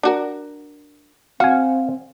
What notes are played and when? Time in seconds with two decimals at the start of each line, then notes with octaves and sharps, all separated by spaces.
0.03 D4 F#4 A#4
1.40 C4 F#4 F5 G#5